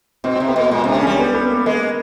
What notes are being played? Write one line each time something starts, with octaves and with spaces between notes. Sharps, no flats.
B2 C4
C4
C3
B3
B2 A#3
A#2 G#3
C3 D4
C#3
G3 C#4
B3
B3
A#3
G#3 A#3